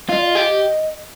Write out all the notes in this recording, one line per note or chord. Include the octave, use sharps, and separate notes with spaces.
F4 D#5
D5
D#5
G4